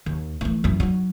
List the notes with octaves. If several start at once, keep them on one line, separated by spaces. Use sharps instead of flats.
D#2
E3 A3
F#2 E3
F#3 D#4